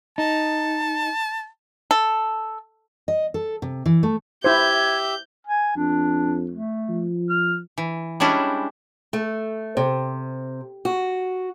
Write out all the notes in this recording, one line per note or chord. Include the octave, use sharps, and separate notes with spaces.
D#4 A5
A4
D#5
A4
C3
E3
A3
E4 G4 C5 E5 G6 G#6
G#5
F2 D4
A3
F3
F6
E3
G3 G#3 C#4 D4 E4
A3
C3
F#4